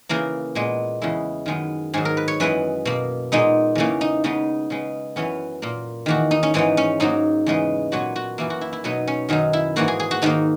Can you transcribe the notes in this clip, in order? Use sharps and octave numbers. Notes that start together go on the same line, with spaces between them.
C#3 E3 A#3 A#4
A#2 G#3 B3
E2 C#3 G#3 E4
F#2 D#3 G#3 B3
G#2 D#3 F#3 G#4
A#4
B4
C#5
F#2 E3 G#3 B3 B4
B2 A#3
A#2 G#3 B3 D#4
E2 C#3 E3 A#3 C#4
D#4
C#3 G#3 B3 D#4
C#3 G#3 B3
F#2 E3 B3 C#4
A#2 A#3
E2 D#3 A#3 F#4
D#4
C#4
G#2 E3 G#3 B3 D#4
C#4
G#2 F#3 A#3 D#4
E2 C#3 G#3 B3
A#2 F#3 B3 F#4
F#4
F#2 E3 A#3 E4
F#4
E4
E4
B2 F#3 B3 D#4
C#4
F#2 D#3 F#3 D#4
E4
G#2 E3 A#3 F#4
G#4
G#4
F#4
G#2 D#3 A#3 D#4